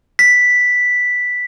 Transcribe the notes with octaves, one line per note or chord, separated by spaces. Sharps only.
B6